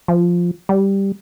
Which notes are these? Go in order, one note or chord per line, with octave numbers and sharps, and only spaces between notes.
F3
G3